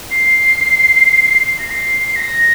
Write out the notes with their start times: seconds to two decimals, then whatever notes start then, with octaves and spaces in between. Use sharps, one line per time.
0.11 C7
1.48 C7
1.59 A#6
1.70 C7
2.08 C7
2.16 A#6